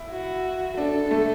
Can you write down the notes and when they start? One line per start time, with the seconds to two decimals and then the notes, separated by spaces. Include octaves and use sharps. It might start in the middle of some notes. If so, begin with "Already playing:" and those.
Already playing: E4
0.11 F#4
0.77 D4 A4
1.11 A3